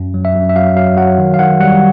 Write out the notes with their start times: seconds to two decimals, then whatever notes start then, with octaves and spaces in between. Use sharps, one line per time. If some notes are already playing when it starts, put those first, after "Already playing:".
Already playing: F#2
0.14 F#3
0.25 E5
0.35 F#2
0.49 E5
0.56 F#3 F5
0.76 F#3 F5
0.97 F#3 F#5
1.18 D#3
1.34 F5
1.39 D#3 F#5
1.60 G3 F#5